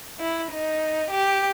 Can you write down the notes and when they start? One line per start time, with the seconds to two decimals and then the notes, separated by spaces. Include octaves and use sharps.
0.20 E4
0.51 D#4
1.10 G4